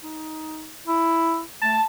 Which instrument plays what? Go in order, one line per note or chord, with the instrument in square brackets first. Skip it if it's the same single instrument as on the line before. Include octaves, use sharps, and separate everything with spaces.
[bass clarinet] D#4
E4
[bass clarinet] A3 [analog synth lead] A5